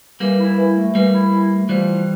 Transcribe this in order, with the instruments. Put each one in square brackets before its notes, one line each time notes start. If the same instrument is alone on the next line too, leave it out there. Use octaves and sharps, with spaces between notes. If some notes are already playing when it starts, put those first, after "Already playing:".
[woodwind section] E3 [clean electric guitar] G3 A#3
[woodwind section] E4
E3
A3
[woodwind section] E3 [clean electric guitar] G3 A#3
[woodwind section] E4
E3
A3
[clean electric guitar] E3 G3 [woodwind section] F3
[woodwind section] E4